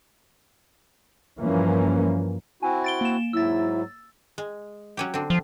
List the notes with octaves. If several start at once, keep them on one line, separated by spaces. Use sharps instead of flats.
G2 E3 F3 A#3 C#4
C4 E4 F#4 G#5
A6 D7 G7
A#3 E7
G#2 F#3 E4 E6 A6
G#3
F#3 C#4 G4
D3 C4
F3